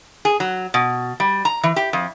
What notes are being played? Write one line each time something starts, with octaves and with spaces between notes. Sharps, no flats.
G#4
F#3
B2
G3
A#5
E3
G4
F2